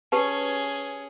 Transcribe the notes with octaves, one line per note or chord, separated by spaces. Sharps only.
C#4 G4 G#4 B4 A5